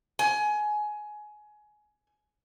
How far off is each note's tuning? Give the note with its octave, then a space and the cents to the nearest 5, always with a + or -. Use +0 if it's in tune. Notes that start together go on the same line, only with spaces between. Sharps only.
G#5 +20